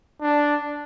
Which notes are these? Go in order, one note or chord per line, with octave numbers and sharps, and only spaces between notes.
D4